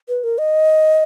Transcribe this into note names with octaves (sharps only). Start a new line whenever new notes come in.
B4
A#4
D#5